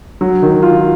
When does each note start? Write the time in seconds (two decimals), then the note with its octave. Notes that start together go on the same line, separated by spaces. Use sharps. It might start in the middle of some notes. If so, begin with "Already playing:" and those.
0.21 F#3
0.42 D#3
0.62 F4